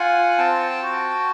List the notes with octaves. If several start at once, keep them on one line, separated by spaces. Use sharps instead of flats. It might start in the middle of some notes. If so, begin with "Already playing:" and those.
Already playing: F4 F#5 G#5
C4 G5 A5
F#4